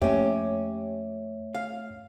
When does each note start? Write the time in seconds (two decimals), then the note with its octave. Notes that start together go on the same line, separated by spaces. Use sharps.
0.02 F2 A3 A#3 C#4 G4 C#5 E5
1.54 F5